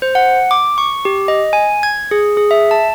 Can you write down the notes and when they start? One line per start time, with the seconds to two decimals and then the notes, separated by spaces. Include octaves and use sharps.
0.02 C5
0.15 F#5
0.51 D6
0.78 C#6
1.05 G4
1.28 D#5
1.53 G#5
1.83 G#6
2.11 G#4
2.37 G#4
2.51 E5
2.71 A5